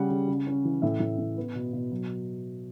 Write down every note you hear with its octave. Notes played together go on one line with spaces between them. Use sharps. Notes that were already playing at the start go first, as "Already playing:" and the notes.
Already playing: C#3 G3 C#4 F#5
C#3
C#3
C#4
E3
A2 E5
A2
A2
B3
B2
B2
F#3